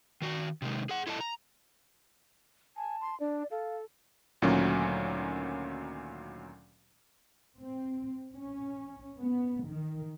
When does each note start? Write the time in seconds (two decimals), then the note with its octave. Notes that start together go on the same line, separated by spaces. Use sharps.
0.22 D#3 F#4
0.62 C3 D#3 G#3
0.89 G#4 F#5
1.07 E4 A4 D#5 A5
1.21 A#5
2.76 G#5 A5
3.01 C6
3.20 D4 D5
3.51 A4 F5
4.42 D2 A#2 D#3 F#3 C#4
7.58 C4
8.34 C#4
9.18 B3
9.67 D#3